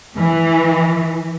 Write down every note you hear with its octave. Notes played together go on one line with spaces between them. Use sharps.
E3